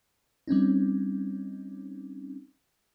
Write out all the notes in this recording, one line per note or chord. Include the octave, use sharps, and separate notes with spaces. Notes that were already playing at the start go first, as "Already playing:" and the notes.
G3 C4 C#4 D#4